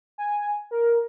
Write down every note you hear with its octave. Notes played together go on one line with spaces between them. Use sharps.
G#5
A#4